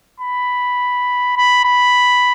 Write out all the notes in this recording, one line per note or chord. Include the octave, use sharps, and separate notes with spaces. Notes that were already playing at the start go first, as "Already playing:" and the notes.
B5
B5
B5